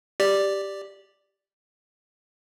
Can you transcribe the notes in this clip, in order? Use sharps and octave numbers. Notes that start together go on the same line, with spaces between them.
G4 D5